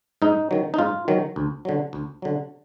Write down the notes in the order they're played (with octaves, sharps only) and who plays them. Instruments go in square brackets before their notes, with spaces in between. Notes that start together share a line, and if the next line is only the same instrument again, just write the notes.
[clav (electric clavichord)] G#2 D#4
D#3 F#3
D#4
G#2 F4
D#3 F#3
D2
D3 F#3
D2
D3 F#3